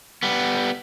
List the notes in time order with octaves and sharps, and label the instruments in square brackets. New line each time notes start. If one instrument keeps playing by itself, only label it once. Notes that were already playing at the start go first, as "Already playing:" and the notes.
[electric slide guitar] G3 B3